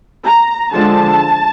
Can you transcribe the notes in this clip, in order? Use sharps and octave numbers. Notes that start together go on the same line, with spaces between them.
A#5
D3 F3 G#3 A5